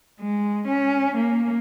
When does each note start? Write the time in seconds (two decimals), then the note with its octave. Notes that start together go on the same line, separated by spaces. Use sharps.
0.20 G#3
0.67 C#4
1.17 A#3